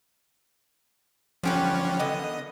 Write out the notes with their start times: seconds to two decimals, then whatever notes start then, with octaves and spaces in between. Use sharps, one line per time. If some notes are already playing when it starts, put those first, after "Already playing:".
1.43 D3 F3 C#4 G4 B4
2.00 D3 D#3 B3 D#5